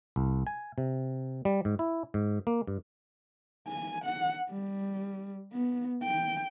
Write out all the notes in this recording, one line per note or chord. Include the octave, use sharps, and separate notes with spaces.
C2
G#5
C3
G3
G#2
E4
G#2
A#3
G2
G#5
F#5
G3
B3
G5